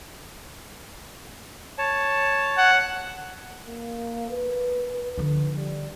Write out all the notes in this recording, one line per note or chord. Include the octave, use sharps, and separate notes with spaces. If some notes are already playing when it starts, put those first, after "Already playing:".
C#5 A5
F#5
A#3
B4
D3 F3
G3